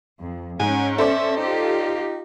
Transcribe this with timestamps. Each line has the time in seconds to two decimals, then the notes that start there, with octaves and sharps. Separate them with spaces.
0.18 F2
0.60 G#2 C#4 G#5
0.98 A4 C5 D5 E5
1.37 D#4 F4 G4